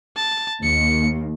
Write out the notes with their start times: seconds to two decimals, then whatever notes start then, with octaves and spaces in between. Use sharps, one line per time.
0.16 A5
0.63 D#2 C#7